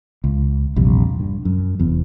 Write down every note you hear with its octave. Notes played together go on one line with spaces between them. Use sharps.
C#2
A#1 E2 C3 G3
G2
F#2
F1 E2